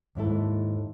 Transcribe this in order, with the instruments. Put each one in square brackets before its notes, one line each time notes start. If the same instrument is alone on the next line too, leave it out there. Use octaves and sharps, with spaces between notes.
[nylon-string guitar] D#2 G#2 E4 A4